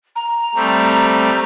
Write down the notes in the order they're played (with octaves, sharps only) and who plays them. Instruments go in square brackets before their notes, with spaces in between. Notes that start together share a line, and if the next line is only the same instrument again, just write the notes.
[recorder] A#5
[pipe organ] G3 A3 C4